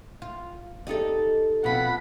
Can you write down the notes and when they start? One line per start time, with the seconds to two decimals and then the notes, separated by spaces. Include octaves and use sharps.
0.22 F4
0.87 D#4 G4 A4 D5 D#5
1.64 B2 F3 C4 F#5 B5